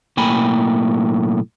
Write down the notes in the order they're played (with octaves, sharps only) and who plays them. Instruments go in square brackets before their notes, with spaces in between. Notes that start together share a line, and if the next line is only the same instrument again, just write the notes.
[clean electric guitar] B1 A2 A#3 G5 G#5 B5